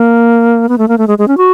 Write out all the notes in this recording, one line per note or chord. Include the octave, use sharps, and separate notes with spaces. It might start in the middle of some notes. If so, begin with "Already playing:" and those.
Already playing: A#3
B3
A3
A#3
A3
G#3
G#3
C#4
F#4